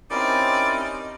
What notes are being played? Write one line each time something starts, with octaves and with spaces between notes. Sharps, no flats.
C4 C#4 D#4 E4 G4 A#4 D5 D#5